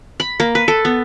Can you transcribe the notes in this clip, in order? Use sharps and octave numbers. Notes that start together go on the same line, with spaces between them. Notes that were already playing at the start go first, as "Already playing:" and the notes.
B5
A#3
B4
A4
B3